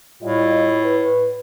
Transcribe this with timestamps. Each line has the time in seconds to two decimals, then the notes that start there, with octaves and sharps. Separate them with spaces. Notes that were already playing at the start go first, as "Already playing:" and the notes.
0.22 A2 G3 F4 D#5
0.84 B4